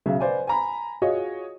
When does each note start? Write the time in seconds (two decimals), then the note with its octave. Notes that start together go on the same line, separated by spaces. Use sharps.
0.06 B1 C#3 E5
0.20 B4 C5 D5 G#5
0.47 G#5 A#5 B5
1.02 F4 F#4 G#4 C#5 D#5